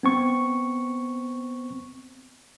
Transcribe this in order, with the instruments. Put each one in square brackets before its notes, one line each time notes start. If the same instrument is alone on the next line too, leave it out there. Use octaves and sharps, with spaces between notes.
[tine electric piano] B3 C4 C#6